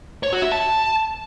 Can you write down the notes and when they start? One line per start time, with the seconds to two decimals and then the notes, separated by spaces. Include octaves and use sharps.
0.23 C#5
0.33 F#4
0.42 E5
0.52 A5